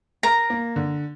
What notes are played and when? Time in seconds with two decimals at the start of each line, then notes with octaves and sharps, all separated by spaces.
0.23 A#4 A#5
0.50 A#3
0.76 D3